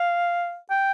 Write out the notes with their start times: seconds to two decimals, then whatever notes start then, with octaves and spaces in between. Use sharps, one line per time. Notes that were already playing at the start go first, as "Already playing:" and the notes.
Already playing: F5
0.70 G5